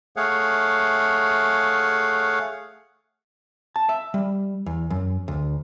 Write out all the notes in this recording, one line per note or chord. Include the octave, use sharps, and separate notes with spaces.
A3 G#4 C#5 F5 F#5
A5
E5
G3
E2
F#2
D2